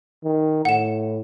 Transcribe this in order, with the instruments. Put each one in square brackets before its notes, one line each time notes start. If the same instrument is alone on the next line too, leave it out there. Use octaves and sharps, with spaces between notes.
[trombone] D#3
[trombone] A2 [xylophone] F#5 E7